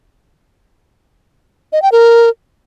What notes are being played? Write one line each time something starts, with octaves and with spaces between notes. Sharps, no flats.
D#5
G5
A#4